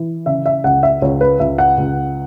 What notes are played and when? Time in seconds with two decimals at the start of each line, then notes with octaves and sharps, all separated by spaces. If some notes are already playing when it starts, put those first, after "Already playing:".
Already playing: E3
0.26 C#3 E5
0.46 E5
0.64 C#2 F#5
0.83 E5
1.02 C#2 C#5
1.21 B4
1.40 C#2 E5
1.58 F#5
1.78 C#2